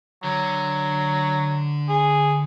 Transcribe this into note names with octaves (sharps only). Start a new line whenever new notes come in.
D3 F#3
G#4